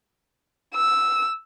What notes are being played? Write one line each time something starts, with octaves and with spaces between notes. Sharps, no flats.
E6